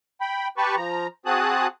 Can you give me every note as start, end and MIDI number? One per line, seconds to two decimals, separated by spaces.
0.21 0.48 79
0.21 0.48 83
0.57 0.75 67
0.57 0.75 71
0.57 0.75 81
0.57 0.75 83
0.57 0.75 85
0.77 1.07 53
0.77 1.07 82
1.26 1.67 60
1.26 1.67 66
1.26 1.67 68
1.26 1.67 81
1.26 1.67 87
1.26 1.67 90